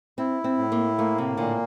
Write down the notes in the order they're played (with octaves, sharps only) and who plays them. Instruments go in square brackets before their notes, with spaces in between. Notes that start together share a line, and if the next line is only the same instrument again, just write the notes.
[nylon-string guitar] C4 [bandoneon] E4
[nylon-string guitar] C4
[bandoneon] A2
[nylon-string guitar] A#3
[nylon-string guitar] A3 [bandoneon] A#3
[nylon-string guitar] C3
[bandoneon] A#2 [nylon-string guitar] D3